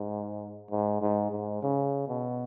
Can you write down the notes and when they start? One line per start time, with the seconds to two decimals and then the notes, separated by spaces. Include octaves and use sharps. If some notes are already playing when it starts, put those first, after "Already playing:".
Already playing: G#2
0.71 G#2
1.01 G#2
1.32 G#2
1.63 C#3
2.08 B2